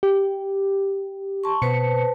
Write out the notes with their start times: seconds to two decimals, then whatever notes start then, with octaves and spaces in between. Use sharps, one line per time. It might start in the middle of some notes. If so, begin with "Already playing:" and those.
0.03 G4
1.44 A5 C6 C#6
1.62 B2 B4 C5 A5 C#7